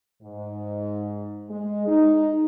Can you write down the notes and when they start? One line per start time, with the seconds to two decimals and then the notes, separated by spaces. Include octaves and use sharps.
0.22 G#2
1.50 G#3
1.86 D#4